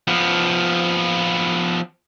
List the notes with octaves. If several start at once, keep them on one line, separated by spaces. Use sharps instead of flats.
F3 B3